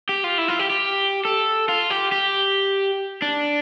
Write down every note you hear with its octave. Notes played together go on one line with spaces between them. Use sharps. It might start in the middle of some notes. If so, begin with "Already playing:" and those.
G4
F4
E4
F4
G4
G4
A4
F4
G4
G4
D4